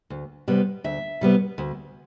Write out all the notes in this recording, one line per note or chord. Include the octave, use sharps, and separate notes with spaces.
D2
C3 G3 B3
D2 E5
C3 G3 B3
D2